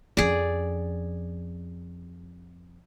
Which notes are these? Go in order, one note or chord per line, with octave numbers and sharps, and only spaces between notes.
F2 C#4 G#4 D5